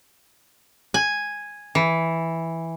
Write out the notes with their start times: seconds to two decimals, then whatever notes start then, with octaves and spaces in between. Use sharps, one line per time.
0.94 G#5
1.75 E3